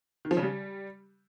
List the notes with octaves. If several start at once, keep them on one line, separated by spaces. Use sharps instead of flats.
D#3
F3
C#3
G3